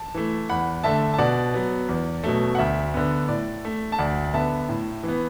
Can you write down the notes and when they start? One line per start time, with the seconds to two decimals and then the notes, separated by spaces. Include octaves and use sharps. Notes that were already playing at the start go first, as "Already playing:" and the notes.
Already playing: A5
0.14 E3 A3
0.49 E2 F#5 B5
0.84 D3 A3 E5 A5
1.14 A5
1.19 B2 D5 F#5
1.54 F#3 B3
1.89 E2
2.24 B2 F#3 A3
2.55 F#5
2.59 D2 E5
2.94 D3 B3
3.29 A2 D5
3.65 A3
3.92 A5
3.98 D2 D5 F#5
4.24 F#5
4.33 D3 B3 E5 A5
4.69 A2
5.03 E3 B3